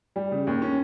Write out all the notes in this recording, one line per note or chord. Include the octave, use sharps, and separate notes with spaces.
G3
C#3
D#2
C#4